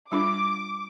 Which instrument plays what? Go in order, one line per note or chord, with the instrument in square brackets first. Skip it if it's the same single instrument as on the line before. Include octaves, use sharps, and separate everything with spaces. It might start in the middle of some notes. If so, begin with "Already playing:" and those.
[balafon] G3 D4 F4 [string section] D6